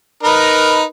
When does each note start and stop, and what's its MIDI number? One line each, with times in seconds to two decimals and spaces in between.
0.23 0.84 63
0.23 0.84 70
0.23 0.84 71